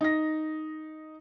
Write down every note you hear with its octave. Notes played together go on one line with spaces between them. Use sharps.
D#4 A#6